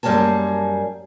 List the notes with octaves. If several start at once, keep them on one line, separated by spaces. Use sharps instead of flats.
F#2 G3 A#3 G#4 A5